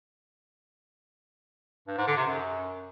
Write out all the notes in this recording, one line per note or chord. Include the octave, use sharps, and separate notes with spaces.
G2
G#2
D3
C3
F#2